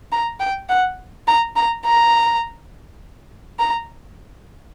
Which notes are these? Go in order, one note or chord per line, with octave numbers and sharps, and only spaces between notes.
A#5
G5
F#5
A#5
A#5
A#5
A#5